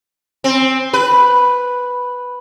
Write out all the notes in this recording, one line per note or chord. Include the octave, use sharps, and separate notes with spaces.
C4
B4